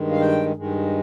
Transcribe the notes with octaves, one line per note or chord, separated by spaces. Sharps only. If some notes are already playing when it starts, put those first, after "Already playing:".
Already playing: G2 D#3 G#3
F5
G5
G2 D#3 G#3